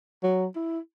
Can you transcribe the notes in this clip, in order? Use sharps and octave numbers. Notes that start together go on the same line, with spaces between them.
F#3
E4